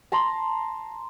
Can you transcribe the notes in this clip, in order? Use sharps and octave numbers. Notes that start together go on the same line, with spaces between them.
A5 A#5 C6